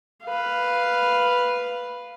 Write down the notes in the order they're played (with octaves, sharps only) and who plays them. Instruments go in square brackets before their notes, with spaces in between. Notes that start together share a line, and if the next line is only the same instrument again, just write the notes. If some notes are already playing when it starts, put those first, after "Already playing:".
[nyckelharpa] B4 F5